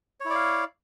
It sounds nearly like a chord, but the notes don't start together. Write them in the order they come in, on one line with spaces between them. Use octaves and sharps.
C#5 E4 D5 F5